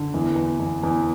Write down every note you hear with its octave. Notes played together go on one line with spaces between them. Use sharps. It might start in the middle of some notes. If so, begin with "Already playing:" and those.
Already playing: D3
E2
E2
E2
E2